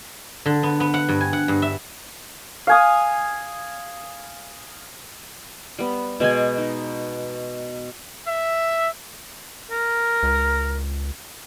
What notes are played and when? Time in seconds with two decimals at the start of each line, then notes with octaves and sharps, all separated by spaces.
0.46 D3
0.63 B3
0.80 B3
0.94 F#5
1.09 G2
1.21 G#5
1.33 F#5
1.48 G2
1.62 E5
2.67 F5 G#5 D#6
5.78 G3 B3
6.20 B2 G#3 B3 G#5
6.58 D#4
8.26 E5
9.71 A#4
10.23 C#2